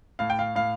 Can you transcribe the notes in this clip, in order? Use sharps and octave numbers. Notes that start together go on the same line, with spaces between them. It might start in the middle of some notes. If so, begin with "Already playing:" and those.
A2 F5
G5
F5
A2 F5